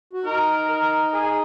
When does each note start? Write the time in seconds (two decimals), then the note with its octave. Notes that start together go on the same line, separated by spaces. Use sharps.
0.13 F#4
0.24 D#4 A#4
0.69 A#4
1.13 G#4